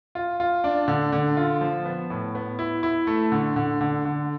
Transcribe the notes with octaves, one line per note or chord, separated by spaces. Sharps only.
F4
F4
D4
D3
D3
F4
F3
B3
A2
B3
E4
E4
A3
D3
D3
D3
D3